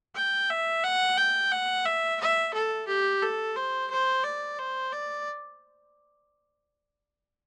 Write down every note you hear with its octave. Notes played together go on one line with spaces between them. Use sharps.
G5
E5
F#5
G5
F#5
E5
E5
A4
G4
A4
C5
C5
D5
C5
D5